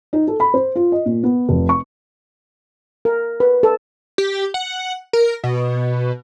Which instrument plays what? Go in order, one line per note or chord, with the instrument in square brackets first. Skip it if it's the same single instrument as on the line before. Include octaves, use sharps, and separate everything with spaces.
[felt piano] D#4
A4
B5
C5
F4
D#5
A#2
B3
F1
C#6
[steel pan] A#4
B4
A4
[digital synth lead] G4
F#5
A#4
B2